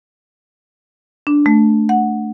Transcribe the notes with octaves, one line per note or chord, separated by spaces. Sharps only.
D4
A3
F#5